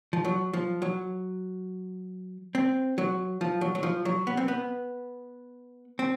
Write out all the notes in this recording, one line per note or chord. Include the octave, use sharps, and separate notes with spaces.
F3
F#3
F3
F#3
C4
F#3
F3
F#3
F#3
F3
F#3
B3
C4
B3
C4